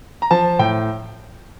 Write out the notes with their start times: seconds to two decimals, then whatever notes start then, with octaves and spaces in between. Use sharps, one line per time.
0.22 A#5
0.31 F3 A5
0.59 A2 G5